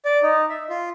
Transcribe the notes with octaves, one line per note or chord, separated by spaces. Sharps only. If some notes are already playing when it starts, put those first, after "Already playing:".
D5
D#4
E5
F4